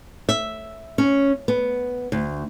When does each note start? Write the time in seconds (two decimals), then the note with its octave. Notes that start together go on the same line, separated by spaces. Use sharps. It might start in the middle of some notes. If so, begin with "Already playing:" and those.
0.29 E5
0.98 C#4
1.48 B3
2.12 D2